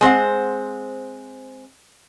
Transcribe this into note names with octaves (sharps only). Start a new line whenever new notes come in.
G#3 C4 C5 F#5